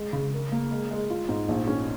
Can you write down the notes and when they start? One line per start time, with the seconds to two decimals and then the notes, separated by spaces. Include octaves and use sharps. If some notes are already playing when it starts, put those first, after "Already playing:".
Already playing: G#3
0.13 C#3
0.33 A#4
0.52 A#3
0.71 G#3
0.91 G#3
1.10 F4
1.29 G#2
1.49 A#1
1.68 C#4